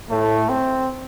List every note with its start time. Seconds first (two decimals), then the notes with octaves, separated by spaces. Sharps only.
0.11 A2 A3
0.49 C4